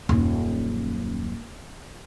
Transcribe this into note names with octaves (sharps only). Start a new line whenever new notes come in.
D#1 F#2